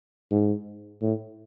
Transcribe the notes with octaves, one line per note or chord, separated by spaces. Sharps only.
G#2
A2